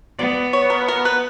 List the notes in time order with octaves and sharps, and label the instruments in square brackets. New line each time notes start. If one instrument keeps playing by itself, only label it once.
[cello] B3 [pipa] D5
[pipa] C#5
A#4
A#4
B4